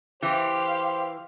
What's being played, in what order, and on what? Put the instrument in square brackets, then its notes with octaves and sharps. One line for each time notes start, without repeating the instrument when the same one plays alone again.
[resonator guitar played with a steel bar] E3 [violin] G4 F5 [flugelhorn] C5